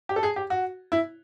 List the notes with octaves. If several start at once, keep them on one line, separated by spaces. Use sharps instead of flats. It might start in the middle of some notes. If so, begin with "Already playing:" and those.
G4
A4
G#4
G4
F#4
E4